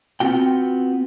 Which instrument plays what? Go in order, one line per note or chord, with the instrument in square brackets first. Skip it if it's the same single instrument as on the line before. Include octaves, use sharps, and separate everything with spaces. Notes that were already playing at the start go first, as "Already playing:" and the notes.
[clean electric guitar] B3 C4 F4 F#4 G5